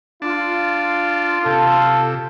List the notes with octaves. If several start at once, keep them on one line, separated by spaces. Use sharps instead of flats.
D4 F4
C3 A4